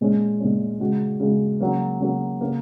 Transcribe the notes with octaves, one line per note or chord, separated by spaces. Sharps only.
A#2 G#3 C#4
A#2 G#3 C#4
C#3 G#3 F#4
C#3 G#3 F#4
C#3 F#3 A#3
C#3 F#3 A#3
C#3 A#3